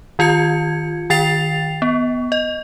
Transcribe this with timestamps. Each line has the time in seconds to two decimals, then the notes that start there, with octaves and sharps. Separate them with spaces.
0.19 D#3 F4 G#6 C#7
1.10 D#3 G5 A6 C7 F7
1.82 B3
2.32 D#5